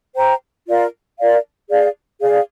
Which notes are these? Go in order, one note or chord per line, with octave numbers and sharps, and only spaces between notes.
C5 G5 A#5
F4 A#4 D5 F5
F4 A#4 D5 F5
G#4 D5 F5
G#4 D5 F5